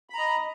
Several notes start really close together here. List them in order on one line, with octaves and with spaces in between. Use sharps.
B5 A#5 D#5